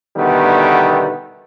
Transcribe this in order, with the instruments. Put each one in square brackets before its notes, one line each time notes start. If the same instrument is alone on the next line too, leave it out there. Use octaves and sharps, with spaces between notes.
[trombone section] B2 D3 D#3 G3 A3 B3